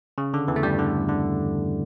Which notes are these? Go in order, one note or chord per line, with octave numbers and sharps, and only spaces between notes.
C#3
D3
E2 E3
A3
G2 G3
D3
D3